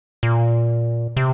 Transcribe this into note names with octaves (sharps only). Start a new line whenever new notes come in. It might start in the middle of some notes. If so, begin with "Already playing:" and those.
A#2
C3